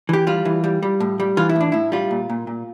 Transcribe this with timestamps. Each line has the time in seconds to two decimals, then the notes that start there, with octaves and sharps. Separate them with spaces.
0.09 E3 G4
0.27 G3 F4
0.45 E3
0.64 G3
0.83 G3
1.00 A2
1.20 G3
1.37 E3 F4
1.49 E4
1.56 A2 D4
1.72 A2 E4
1.92 G3 F4
2.11 A#2
2.30 A#2
2.47 A#2